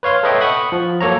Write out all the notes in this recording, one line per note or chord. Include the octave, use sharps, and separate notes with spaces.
B4 C#5 F5 C6
A4 B4 C#5 D#5 E5 G5
F#5 B5 C#6 D#6
F3
F#3 A#3 A4 C#5 A#5